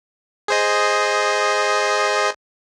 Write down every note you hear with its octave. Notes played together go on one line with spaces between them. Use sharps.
G#4 C5 D#5